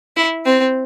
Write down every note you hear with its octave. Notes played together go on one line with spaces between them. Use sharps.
E4
C4